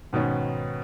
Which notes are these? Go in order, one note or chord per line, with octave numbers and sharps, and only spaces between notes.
G#2 B2 D#3 B3 C#4